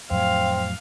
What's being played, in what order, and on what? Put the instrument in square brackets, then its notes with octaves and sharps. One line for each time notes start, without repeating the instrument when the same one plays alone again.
[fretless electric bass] F2 A2 F#3 [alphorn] C4 [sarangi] F5